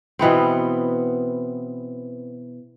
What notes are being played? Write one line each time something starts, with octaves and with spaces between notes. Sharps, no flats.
B2 E3 B3 C4